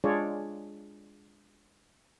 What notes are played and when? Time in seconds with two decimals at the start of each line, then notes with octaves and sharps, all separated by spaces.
0.04 G#3 D4 F4 G#4 C#5 D5